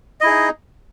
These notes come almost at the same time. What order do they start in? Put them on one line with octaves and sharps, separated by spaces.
D#5 E4 G#4 D#4